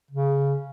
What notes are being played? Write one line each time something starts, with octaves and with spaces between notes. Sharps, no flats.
C#3